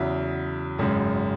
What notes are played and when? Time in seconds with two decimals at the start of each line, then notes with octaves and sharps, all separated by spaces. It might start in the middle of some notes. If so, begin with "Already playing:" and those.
Already playing: E2 C#3 F#3 E5
0.78 G#1 F#2 C#3 G#3